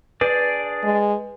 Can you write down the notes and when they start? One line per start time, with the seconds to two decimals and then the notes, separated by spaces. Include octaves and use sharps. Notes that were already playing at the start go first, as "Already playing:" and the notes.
0.21 D4 G#4 B4 D5
0.84 G#3